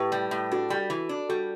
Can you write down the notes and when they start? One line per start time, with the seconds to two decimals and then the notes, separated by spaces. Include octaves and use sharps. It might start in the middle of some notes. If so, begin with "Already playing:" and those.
Already playing: A2 G4 B4
0.12 G3
0.31 A2
0.51 D4 F#4 A4
0.70 G3
0.90 E3
1.09 D4
1.29 G3 F#4 A4